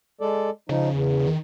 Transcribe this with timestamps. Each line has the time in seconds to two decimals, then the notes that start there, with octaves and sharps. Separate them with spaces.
0.21 G#3 A4 D5
0.69 C#3 F3 D#4
0.91 E2
1.27 D#3